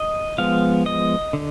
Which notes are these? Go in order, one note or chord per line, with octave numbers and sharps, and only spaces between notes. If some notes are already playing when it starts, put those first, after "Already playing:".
Already playing: D#5
F3 G#3 B3 F5
D#5
D3